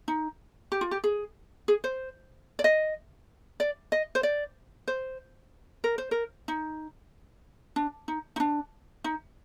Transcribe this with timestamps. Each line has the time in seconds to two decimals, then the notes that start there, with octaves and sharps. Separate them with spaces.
0.08 D#4
0.72 G4
0.81 F4
0.91 G4
1.04 G#4
1.68 G#4
1.84 C5
2.59 D5
2.64 D#5
3.60 D5
3.92 D#5
4.15 C5
4.23 D5
4.88 C5
5.84 A#4
5.98 C5
6.11 A#4
6.48 D#4
7.76 D4
8.08 D#4
8.36 D#4
8.40 D4
9.04 D#4